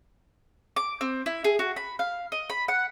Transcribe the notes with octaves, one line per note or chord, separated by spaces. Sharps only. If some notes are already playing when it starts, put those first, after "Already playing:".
D6
C4
E4
G#4
F#4
B5
F5
D#5
B5
F#5